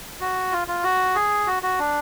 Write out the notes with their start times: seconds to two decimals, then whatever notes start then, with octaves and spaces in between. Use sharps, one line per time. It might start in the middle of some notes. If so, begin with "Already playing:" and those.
0.21 F#4
0.52 F4
0.68 F4
0.83 F#4
1.15 G#4
1.47 F#4
1.63 F#4
1.79 D4